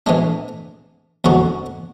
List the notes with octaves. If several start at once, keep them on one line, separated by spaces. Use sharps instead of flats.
A2 E3 G#3 D4
E2 D3 G#3 C#4 F#4